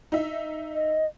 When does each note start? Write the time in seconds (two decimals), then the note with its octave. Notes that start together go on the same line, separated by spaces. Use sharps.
0.12 D#4 E5
0.74 D#5